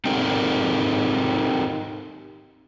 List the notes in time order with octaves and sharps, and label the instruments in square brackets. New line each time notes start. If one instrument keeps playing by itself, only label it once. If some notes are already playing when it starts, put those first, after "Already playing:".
[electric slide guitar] C4 D#4 G4 A4 A#4